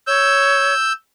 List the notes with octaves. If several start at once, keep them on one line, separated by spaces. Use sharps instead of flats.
C#5 E6 G6